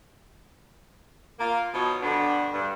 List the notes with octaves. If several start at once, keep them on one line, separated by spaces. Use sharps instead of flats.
A#3 F4
B2 F3 D#4 C#5
G2 B2 D3 D4
G2